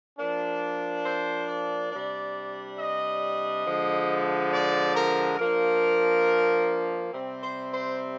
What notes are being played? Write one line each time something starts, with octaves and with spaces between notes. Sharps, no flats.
F3 A#3 D4
C5
D5
C3 G3 D4
D#5
D3 F3 G#3
D5
A#4
F3 A#3 D4 A#4
C3 G3 C4
C5
C5